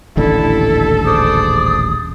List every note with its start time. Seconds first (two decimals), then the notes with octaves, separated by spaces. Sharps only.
0.17 D#1 A1 D3 E4 A4
1.05 G#4 C5 D5 D#6